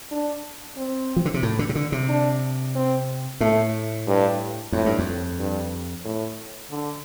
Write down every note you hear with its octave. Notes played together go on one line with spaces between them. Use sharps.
D4
C4
F3
D3
C3
A2
D3
C3
D3
C3
D4
C4
A2 A3
G2
F2 A2
G2
F2
G2
A2
D3